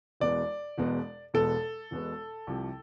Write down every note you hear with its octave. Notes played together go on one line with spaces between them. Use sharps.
E1 E2 B2 G#3 B3 D5
E1 E2 B2 G#3 B3
E1 E2 B2 G#3 B3 A4
E1 E2 B2 G#3 B3
C2 C3 F3